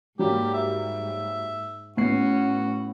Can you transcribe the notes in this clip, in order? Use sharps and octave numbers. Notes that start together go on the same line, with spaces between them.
G#2 F#3 G3 A#3 G4
E5
A2 B3 C#4 F#4 C7